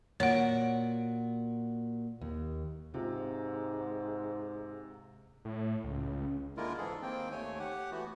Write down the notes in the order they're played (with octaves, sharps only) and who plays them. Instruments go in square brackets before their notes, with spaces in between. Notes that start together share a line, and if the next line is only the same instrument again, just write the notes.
[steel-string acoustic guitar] A#2 F#4 [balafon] C#5 F#5
[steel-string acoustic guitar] D#2
[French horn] G#2 [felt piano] C3 F4
[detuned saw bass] A2 [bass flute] A3
[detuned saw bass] C#2 [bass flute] C#3
[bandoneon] D3 G#3 A#3 E4 F4 A#4
G#2 E3 G#4 A4
D#3 A#3 C4 G5
D#2 A3 C#5 G#5
G4 F#5
E3 A3 B3 F#4